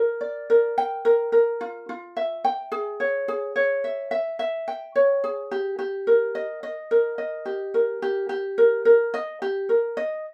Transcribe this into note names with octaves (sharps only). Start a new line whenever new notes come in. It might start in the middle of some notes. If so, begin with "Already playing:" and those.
Already playing: A#4
D5
A#4
G5
A#4
A#4
F4
F4
E5
G5
G#4
C#5
G#4
C#5
E5
E5
E5
G5
C#5
G#4
G4
G4
A#4
D#5
D#5
A#4
D#5
G4
A#4
G4
G4
A#4
A#4
D#5
G4
A#4
D#5